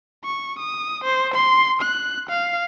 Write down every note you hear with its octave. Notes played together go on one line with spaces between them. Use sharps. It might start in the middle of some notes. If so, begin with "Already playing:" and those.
C#6
D#6
C5
C6
F#6
F5